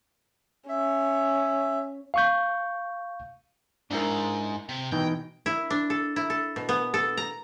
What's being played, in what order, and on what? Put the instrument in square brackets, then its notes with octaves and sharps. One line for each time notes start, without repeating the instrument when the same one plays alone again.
[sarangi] C#4 [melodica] E5
[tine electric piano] F5 C#6 G6
[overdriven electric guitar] G#2 [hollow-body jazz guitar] D4 E4 A#4
[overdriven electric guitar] C3
[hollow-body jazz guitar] B2 E3 D#4 [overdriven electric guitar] G5
[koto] E4
D4
A4
E4
A4
B2
B3
A4
A#5